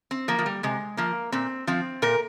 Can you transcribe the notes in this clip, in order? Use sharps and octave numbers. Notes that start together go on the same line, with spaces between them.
C4
F3 A#3
F3
G3
C3 G#3
F3 A#3
A#2 C4
F3 C4
A#2 A#4